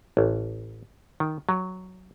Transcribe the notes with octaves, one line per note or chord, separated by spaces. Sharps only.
A1
D#3
F#3